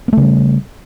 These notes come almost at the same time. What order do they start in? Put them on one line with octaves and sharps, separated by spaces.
B3 A3 C#3 G3